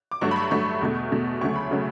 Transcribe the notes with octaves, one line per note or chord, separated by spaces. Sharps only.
D6
G2 F#3 A3 C#6
B5
C#6
G2 F#3 A3 C#6
E2 B2 A3
E2 B2 A3
D2 C#3 F#3 A3 C#6
B5
C#3 F#3 A3